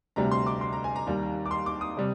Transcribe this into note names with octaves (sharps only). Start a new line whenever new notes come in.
D2 C3 G3 A#5
C6
D6
C6
A#5
G#5
A#5
D#2 D#3 G3
D6
C6
D6
D#6
C3 G3